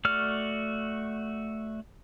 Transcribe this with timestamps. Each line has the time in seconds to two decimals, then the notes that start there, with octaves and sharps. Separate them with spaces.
0.05 A3 F#4 D5 F6